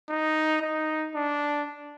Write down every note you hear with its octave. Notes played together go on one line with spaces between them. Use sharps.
D#4
D#4
D4